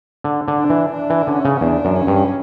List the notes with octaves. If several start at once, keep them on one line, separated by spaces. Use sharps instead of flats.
D3
D3
D4
E3
D4
E3
D3 C#4
C#3
E2 D4
F#2
C#4
G2